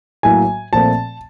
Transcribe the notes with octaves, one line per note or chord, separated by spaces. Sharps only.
A2 F#3 A#3 G#5
A#2 F3 A3 C4 A5